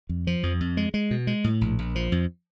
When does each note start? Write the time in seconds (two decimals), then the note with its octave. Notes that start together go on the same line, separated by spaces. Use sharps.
0.09 F2
0.27 F3
0.43 F2
0.61 F2
0.77 G#3
0.94 G#3
1.11 B2
1.27 G#3
1.44 A2
1.61 A#1
1.79 A#1
1.95 F3
2.12 F2